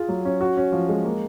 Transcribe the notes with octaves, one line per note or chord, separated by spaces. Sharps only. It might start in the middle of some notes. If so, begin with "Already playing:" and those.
Already playing: F4 G#4
F#3
C#4
F#4
C#4
F3
G#3
A#3